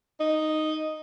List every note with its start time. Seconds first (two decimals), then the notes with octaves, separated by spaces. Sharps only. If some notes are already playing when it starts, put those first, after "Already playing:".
0.20 D#4